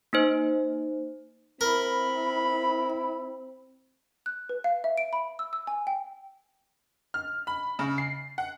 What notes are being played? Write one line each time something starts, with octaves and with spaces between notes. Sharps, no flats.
A#3 D#4 C5
C4 E4 A#4 B5
F#6
B4
F5
E5
D7
B5
E6
E6
G#5
G5
F6
B5
C#3
C7
F#5